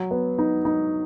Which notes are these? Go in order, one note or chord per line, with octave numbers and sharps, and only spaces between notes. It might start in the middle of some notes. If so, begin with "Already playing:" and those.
Already playing: F#3
B3
D#4
D#4